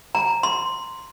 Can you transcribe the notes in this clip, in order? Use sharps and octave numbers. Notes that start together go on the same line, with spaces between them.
A#5
C6